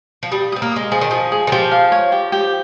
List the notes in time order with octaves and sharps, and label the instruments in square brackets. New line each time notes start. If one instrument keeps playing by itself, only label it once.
[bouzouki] F3
[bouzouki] G3 [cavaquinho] D#6
[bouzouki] C4 [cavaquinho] D#6
[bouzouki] A#3
[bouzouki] G#3 [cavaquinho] D#6
[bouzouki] F3 [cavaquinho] G#4
[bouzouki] D#3
[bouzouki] F3 [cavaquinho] D#6
[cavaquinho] G#4
[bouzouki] D#3
[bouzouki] F3 [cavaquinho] G4
[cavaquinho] F5
C#5
G4
G4